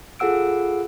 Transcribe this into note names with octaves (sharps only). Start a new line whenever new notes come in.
F4 G#4 A4 F#5 E6 D7